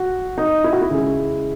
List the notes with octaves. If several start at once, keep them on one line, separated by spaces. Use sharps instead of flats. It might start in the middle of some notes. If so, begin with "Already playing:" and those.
Already playing: F#4
D#4
E4
F#4
E4
C#3 G#3